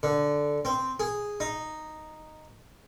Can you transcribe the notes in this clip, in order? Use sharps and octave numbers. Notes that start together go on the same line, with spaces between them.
D3
C4
G#4
D#4